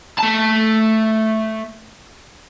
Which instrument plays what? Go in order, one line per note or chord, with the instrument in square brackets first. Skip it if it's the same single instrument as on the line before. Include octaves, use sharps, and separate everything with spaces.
[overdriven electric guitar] A3 A5